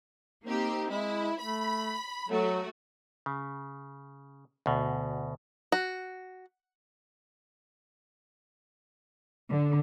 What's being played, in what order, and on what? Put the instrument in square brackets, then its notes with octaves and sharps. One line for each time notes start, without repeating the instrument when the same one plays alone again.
[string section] A#3 C4 G4 [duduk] D#4
[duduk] G#3 [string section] E4
[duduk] A3 [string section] B5
[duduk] F#3 [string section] A3 F#4
[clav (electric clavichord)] C#3
D2 B2
[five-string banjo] F#4
[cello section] D3